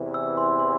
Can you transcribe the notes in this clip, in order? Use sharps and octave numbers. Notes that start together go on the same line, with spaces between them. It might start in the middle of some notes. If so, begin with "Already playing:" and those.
Already playing: E2 C3 E3
E6
C6
C6